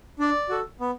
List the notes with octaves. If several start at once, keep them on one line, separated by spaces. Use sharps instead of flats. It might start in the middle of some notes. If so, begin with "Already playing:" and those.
D4 D5
F#4 A4
B3